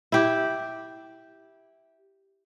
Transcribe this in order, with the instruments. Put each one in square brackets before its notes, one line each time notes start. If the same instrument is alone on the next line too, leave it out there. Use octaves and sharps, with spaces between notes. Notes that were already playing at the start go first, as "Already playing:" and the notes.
[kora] E4 G4